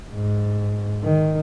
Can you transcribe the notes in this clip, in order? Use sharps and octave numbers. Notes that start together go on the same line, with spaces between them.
G#2
D#3